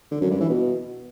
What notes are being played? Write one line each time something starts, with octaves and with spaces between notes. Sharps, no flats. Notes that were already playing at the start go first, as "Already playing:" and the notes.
D3
F#2
G2
E3
B2